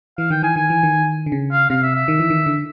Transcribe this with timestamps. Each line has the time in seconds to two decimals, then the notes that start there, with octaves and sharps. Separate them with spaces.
0.18 E3 F5
0.30 D#3 G5
0.42 E3 G#5
0.56 D#3 G#5
0.70 E3
0.83 D#3
1.26 D3
1.32 C#3
1.52 F5
1.70 C3 F5
1.83 E5
1.95 E5
2.08 D#3
2.20 E3
2.30 D#3
2.46 D3